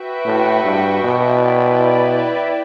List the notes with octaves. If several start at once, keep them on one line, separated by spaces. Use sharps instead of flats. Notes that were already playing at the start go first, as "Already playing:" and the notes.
Already playing: F#4 B4 E5 G5
A2
G2
B2
E4 B4 D5 G5